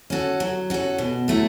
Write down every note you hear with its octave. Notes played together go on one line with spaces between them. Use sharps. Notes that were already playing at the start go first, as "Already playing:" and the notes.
C#4 F#4 A4
F#3
C#4 F#4 A4
B2
F#3 A3 E4 A4